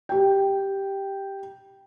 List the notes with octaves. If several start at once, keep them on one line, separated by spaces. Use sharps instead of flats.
G4 G5